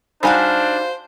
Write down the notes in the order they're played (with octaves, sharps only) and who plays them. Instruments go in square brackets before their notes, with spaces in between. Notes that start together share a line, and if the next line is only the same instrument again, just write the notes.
[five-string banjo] G3 D#4 G#5 [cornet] D4 [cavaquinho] F#4 F5 B5 [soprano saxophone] C5